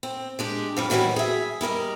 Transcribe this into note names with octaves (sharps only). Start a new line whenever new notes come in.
C4
G#3 D4 G4
F2 F3 G3
B2 D#3 E3 F#3 G3 C4
G#4 E5
G3 E4 A#4 D#5